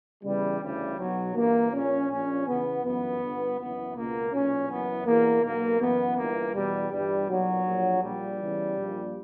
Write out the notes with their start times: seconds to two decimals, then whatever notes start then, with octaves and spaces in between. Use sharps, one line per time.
0.23 E2 C#3 E3 G3
0.61 D2 C#3 E3 G3
0.98 B1 B2 F#3
1.35 G1 G2 E3 A#3
1.72 A#1 A#2 C#4
2.09 A#1 A#2 C#4
2.46 E2 C#3 E3 B3
2.83 G1 F#2 E3 B3
3.20 G1 G2 D3
3.57 F#1 F#2 E3 B3
3.94 C#2 B2 A#3
4.32 B1 A#2 C#4
4.69 F#1 F#2 E3 B3
5.05 E2 B2 A#3
5.43 B1 B2 A#3
5.80 F#1 F#2 E3 B3
6.17 G1 G2 E3 A#3
6.54 E2 B2 G3
6.91 G1 G2 E3 G3
7.28 B1 A#2 F#3
7.65 A#1 A#2
8.02 A#1 A#2 G3
8.39 E2 C#3 E3
8.77 A#1 A#2